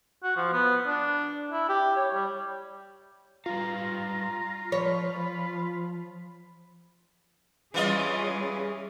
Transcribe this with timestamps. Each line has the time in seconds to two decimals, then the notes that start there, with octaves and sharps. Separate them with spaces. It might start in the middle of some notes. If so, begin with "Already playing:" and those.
0.23 F#4
0.36 F3
0.53 B3
0.87 D4
1.51 E4
1.69 G4
1.96 C#5
2.14 G3
3.46 G3 F4 B4 F5 A#5
4.72 F3 C#5 B5
7.74 E3 G3 C#4 F4 G#4 D#5